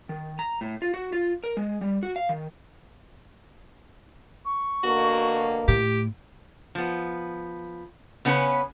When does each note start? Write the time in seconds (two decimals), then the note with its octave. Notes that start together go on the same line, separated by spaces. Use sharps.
0.09 D#3
0.39 A#5
0.61 A2
0.82 F4
0.94 F#4
1.13 F4
1.44 A#4
1.57 G#3
1.81 G3
2.03 F#4
2.16 F5
2.29 D#3
4.45 C#6
4.83 B2 D3 A#3 F#4
5.68 A2 G4 D7
6.75 F3 B3
8.25 C#3 B3 C#4 D4 B4